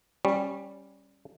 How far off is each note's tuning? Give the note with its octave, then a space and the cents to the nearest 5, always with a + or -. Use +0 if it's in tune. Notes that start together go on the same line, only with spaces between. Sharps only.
G3 +0 C#4 -15